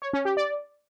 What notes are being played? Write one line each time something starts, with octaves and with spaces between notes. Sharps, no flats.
C#5
C#4
G4
D5